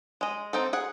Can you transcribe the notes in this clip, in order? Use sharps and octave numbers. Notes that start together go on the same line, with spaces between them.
G#3 D#5
C4 D#4 A4
G#4 F#5